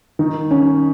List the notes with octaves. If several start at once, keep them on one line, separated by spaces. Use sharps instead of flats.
D#3 D#4
C#4